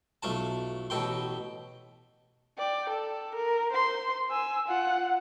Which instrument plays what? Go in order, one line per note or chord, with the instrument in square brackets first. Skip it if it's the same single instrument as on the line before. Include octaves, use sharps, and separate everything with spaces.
[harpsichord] B1 A3 F4 A5
A1 B2 A4 G5 C6
[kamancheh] D5 G5
A4
A#4
C5 C6
G#5 E6
F4 F#5